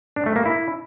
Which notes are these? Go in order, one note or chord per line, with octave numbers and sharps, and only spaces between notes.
D4
A3
A#3
E4